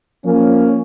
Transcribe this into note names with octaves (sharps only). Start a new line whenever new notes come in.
F3 A#3 C#4